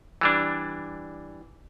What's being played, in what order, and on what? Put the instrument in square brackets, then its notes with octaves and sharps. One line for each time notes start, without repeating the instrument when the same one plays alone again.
[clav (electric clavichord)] E3 G3 D4